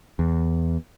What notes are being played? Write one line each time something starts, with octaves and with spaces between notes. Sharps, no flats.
E2